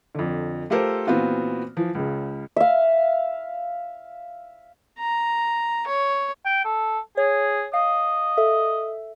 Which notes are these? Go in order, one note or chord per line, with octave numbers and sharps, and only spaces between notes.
F2 D3
A3 F4 G4 A4 A#4 C5
A#2 E3 B3 C4 F4 F#4
E3 F3
C#2 C#3
E5 F5
A#5
C#5
G5
A4
G#4 C#5
D#5 F5
A4 E5